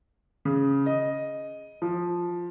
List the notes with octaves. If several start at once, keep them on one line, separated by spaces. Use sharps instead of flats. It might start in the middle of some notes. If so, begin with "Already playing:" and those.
C#3
D#5
F3